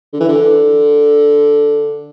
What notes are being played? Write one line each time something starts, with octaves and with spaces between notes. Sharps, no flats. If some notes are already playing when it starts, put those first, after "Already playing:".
D3
E3
D3